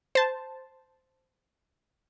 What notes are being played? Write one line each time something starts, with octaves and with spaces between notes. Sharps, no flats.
C5 A5